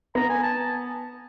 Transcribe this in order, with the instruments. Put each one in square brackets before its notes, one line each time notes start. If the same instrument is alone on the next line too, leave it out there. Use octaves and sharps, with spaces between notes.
[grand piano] B3 [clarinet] A#5
[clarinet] G#5
A5